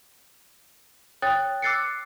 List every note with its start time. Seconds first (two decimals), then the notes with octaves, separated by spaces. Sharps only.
1.22 C#5 G5 D#6 F#6 A6
1.62 D6 E6 F#6 A6 C7 C#7